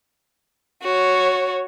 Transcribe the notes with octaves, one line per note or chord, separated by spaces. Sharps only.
F#4 C#5